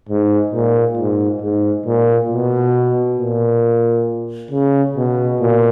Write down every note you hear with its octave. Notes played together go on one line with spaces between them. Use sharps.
G#2
A#2
G#2
G#2
A#2
B2
A#2
C#3
B2
A#2